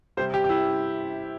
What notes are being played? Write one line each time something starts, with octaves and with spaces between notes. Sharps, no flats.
C3 G3 C5
G4
G4
E4